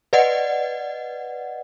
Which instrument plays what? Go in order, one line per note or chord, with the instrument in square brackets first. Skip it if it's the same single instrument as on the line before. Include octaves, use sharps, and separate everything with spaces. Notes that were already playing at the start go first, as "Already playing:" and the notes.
[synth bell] B4 D5 D#5 F#5